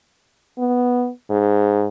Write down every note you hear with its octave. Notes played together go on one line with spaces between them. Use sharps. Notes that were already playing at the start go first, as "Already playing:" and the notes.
B3
G#2